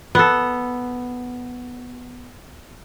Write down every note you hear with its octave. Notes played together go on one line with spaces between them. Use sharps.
B3 A4